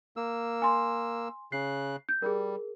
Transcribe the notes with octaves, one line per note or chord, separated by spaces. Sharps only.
A#3 E6
G#5 C6
C#3 F#6 C7
G6
G3 G#4 A#4